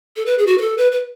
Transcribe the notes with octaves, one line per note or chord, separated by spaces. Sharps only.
A4
B4
G#4
F#4
B4
A4
B4
B4